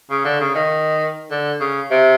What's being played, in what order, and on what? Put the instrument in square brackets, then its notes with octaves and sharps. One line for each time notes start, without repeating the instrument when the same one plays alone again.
[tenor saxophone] C#3
D3
C#3
D#3
D3
C#3
C3